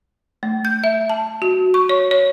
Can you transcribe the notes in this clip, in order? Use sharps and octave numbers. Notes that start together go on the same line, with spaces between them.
A3
G6
E5
A5
F#4
C#6
C#5
C#5